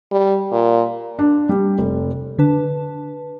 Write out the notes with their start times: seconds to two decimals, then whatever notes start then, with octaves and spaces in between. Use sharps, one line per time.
0.12 G3
0.51 A#2
1.19 D4
1.49 G3
1.79 F1
2.38 D3 D4 B4 A5